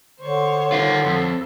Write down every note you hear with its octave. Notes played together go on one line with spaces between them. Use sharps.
D3 C5 C#5
D#3 F4
F2 A4